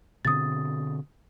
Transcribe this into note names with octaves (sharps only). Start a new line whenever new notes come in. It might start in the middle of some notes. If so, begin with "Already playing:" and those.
B2 D3 C4 D#6 A6